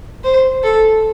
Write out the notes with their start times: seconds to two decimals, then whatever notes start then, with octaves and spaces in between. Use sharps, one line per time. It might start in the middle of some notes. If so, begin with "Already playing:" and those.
0.24 C5
0.64 A4